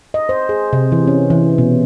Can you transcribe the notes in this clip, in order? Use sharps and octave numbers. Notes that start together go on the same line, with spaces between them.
D#5
C5
G#4
C3
E3
C#4
E3
B2